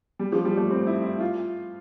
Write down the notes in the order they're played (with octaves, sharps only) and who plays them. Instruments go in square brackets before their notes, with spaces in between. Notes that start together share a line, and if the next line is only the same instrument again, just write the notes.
[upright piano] G3
F3
G3
A3
C4
E4
E4
F4